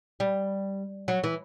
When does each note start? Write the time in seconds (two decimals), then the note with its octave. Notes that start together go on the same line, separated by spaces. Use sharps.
0.20 G3
1.08 F#3
1.24 E3